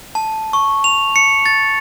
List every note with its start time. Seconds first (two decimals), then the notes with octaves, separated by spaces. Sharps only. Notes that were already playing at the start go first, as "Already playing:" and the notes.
0.15 A5
0.53 C#6
0.84 F7
1.16 C#7
1.46 A6